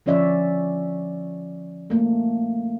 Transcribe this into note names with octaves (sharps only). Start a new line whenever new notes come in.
D3 F3 C#4 C#5 D5 E5
A3 A#3